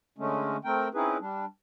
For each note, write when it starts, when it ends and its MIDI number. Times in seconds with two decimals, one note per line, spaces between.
0.18 0.57 50
0.18 0.57 56
0.18 0.57 57
0.18 0.57 61
0.65 0.88 57
0.65 0.88 60
0.65 0.88 70
0.65 0.88 79
0.94 1.17 60
0.94 1.17 61
0.94 1.17 63
0.94 1.17 64
0.94 1.17 68
0.94 1.17 71
1.20 1.45 55
1.20 1.45 62